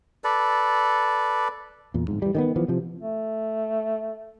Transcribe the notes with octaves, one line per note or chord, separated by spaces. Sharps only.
A4 B4 D5
E2 A#2
D1 G#2
E3 G3
D#3 G3 B3
E3 F3 B3
C3 F3
A3